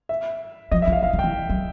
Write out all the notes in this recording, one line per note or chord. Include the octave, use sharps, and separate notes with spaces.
E5
F3 D#5
E5
F3
F5
E3 F5
D#3
G5
E3
F#3